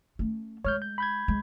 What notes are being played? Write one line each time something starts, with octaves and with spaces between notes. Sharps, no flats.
A3 C#4
G#3 C#5 F6 G6
G6
B5 G6 G#6
G#3